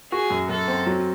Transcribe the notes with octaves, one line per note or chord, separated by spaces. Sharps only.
F#4 G#4
F#2
F#2 A4
C4
F#3